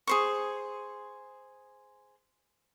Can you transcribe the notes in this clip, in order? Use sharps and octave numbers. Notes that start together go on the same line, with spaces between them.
G#4 C5 C#6